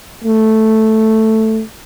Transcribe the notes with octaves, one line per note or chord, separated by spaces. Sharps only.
A3